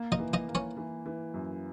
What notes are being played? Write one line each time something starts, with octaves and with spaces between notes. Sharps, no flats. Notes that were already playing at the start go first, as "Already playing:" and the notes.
Already playing: A#3
D#4 D#5
E3
D#4 D#5
A#3
C#4 C#5
E3
E3
F#2